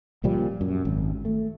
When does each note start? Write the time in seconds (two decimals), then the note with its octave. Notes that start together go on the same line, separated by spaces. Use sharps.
0.24 C#2 A#2 F3 G3
0.61 F#2
0.85 G#1
1.25 A3